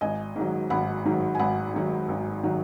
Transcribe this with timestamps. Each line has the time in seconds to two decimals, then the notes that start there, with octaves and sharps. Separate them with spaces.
0.01 G#1 D#5 G#5
0.36 G#2 D#3 F#3
0.70 G#1 F#5 B5
1.05 G#2 D#3 F#3
1.35 G#5
1.39 G#1 F#5 B5
1.74 G#2 D#3 F#3
2.09 G#1
2.43 D#3 F#3